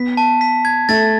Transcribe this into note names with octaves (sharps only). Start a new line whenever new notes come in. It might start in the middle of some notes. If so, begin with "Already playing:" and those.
Already playing: B3 B6
A5
B6
G#6
A3 A6